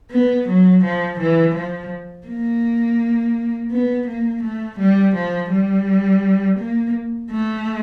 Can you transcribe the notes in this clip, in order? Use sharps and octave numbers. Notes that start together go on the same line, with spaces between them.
B3
F#3
F3
E3
F3
A#3
B3
A#3
A3
G3
F3
G3
A#3
A3